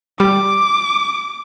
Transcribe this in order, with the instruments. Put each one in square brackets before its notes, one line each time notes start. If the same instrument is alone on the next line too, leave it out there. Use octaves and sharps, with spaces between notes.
[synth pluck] G3 [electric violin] D6